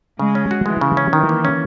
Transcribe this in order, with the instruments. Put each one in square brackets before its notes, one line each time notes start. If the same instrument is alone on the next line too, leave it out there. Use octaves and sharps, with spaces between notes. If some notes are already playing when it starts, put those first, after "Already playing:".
[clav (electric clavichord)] C#3 [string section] G#3
[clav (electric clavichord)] C#4
F#4
[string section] E3 [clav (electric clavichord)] G#3
[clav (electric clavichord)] C#3
C#4
[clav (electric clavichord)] D#3 [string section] E3
[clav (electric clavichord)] A#3
C#4